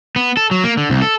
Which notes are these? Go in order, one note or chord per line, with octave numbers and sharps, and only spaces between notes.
B3
A4
F#3
A#3
D3
C2
A4